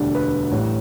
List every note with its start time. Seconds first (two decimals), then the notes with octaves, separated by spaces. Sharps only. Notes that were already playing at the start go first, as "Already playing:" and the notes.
Already playing: E1 D2 D3 G3 D4
0.15 B4
0.51 A1 A2 G3